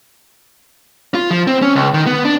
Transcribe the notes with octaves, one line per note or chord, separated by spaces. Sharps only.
F4
F3
C4
C#4
C#2
D#3
B3
D4